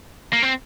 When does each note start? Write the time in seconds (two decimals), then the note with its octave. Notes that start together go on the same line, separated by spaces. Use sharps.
0.33 A#3
0.42 C4